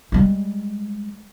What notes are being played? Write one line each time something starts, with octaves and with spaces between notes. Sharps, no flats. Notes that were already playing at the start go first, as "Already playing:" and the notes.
G3 G#3